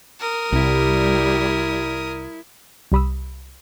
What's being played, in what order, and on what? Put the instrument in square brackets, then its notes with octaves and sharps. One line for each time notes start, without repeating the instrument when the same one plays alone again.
[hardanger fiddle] A#4 D#6
[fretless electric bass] C2 [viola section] G3 [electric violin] E4
[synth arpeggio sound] C2 G3 B5 D#6 E6